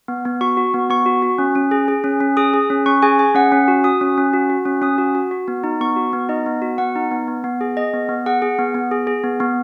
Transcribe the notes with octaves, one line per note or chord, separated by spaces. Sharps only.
B3
B3
F#4 C#6
F#4
B3
B3 C#6
F#4
F#4
C#4
C#4
G#4
G#4
C#4
C#4
G#4 D#6
G#4
C#4
C#4 C#6
G#4 G#5
G#4 G#5
C#4 F#5
C#4
F#4
F#4 D#6
C#4
C#4
F#4
F#4
C#4
C#4 D#6
F#4
F#4
F#4
B3
D#4
B3 C#6
F#4
B3
D#4 D#5
B3
F#4
B3 F#5
D#4
B3
B3
B3
G#4
G#4 D#5
B3
B3
G#4 F#5
G#4
B3
B3
G#4
G#4
B3
B3